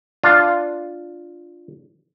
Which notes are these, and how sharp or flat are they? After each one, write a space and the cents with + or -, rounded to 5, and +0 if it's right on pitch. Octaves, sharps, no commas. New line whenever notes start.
D4 +0 F4 +0